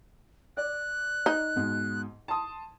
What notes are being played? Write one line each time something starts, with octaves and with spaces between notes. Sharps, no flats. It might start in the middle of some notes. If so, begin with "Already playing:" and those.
D5 F#6
D#4
G#2 B2
A5 C6 D#6